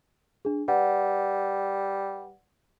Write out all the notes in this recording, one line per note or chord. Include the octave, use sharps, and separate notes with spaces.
D4 G#4
G3 B4 D5 F#5